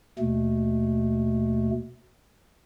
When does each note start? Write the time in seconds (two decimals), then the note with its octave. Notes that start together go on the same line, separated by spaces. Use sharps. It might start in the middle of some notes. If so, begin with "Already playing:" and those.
0.19 D#2 B2 A3